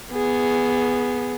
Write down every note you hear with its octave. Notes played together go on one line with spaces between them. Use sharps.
B3 G#4